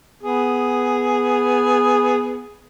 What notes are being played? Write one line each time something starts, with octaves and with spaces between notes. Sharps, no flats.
B3 G#4